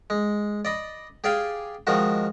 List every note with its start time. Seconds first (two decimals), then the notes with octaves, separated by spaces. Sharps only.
0.10 G#3
0.65 D5 D#5 B5
1.24 G4 G#4 D5 F5 G5 G#5
1.87 D#3 F3 G#3 F#4